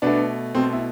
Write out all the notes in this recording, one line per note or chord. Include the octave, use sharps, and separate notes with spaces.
B2 A3 B3 D4
B2 A3 C4
E4